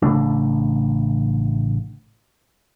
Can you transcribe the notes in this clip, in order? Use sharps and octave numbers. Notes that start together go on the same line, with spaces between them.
A1 C#3 A3 D4